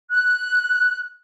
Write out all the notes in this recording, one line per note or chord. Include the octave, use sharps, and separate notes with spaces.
F#6